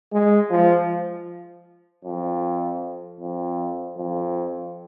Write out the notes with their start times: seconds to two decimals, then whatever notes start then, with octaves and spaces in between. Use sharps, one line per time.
0.12 G#3
0.50 F3
2.05 F2
3.20 F2
3.97 F2